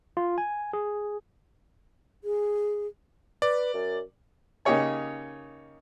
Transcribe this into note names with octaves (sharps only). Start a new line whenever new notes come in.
F4
G#5
G#4
G#4
B4 D5
F#2
C#3 A#3 D#4 G4 C#5 G#5